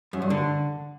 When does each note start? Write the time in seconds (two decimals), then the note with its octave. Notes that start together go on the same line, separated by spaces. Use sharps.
0.13 F#2
0.22 G2
0.30 D3